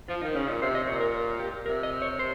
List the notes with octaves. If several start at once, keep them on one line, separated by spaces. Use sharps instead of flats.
F3 F4
D#3 D#4
C#3 C#4
A#2 D#4
C3 C5
D#5
A#2 C#5
A#4
G4
C3 A#4
D#5
C#5
C5